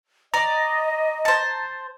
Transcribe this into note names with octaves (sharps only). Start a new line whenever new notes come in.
D5 D#5 A#5
C5 A5